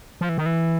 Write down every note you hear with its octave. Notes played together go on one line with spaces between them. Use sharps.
F3
E3
D#3
E3